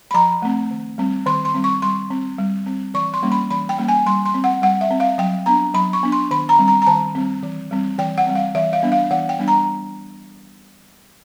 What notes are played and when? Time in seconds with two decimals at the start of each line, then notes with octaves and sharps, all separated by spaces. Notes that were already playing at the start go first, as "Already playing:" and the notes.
0.11 B5
0.14 F3 A#5
0.42 A3 C4
0.71 D#3
0.98 G3 C4
1.26 D#3 C6
1.45 C6
1.55 G3 C4
1.64 C#6
1.82 G3 C6
2.11 C4
2.38 G3
2.67 C4
2.94 E3 C#6
3.14 C6
3.22 G3 A#3 C#4
3.32 B5
3.51 E3 B5
3.69 G5
3.78 G3 A#3 C#4
3.88 G#5
4.07 G3 C6
4.26 C6
4.34 C4
4.44 F#5
4.62 G3 F#5
4.81 E5
4.91 C4
5.00 F5
5.18 F#3 G5
5.46 B3 D4 A#5
5.74 F#3 B5
5.93 C#6
6.03 B3 D4
6.12 C6
6.31 D#3 B5
6.49 A#5
6.59 G3 C4
6.68 A#5
6.82 A#5
6.86 D#3 A5
7.15 G3 C4
7.43 E3
7.71 G3 C4
7.99 E3 G5
8.18 F#5
8.27 G3 C4
8.36 F5
8.55 E3 E5
8.73 F5
8.83 G3 B3 D4
8.92 F5
9.11 E3 F#5
9.29 G5
9.39 G3 B3 D4
9.48 A#5